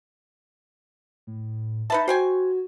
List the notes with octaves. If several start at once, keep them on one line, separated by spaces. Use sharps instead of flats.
A2
D#4 B4 E5 A5
F#4 C5 G5 G#5